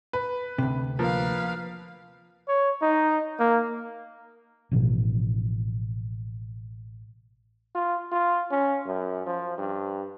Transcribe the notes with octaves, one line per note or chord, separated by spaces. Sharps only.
B4
D2 C3
F3 A#3 B4 F5
C#5
D#4
A#3
A1 B2 F3
F4
F4
C#4
F#2
F3
G2